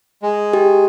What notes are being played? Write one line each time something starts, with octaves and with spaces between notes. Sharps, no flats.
G#3
G4